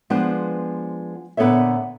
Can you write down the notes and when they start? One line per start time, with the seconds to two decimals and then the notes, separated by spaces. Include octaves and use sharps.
0.10 F3 G#3 B3 D4 C5
1.37 A#2 D3 B3 A4 C#5 E5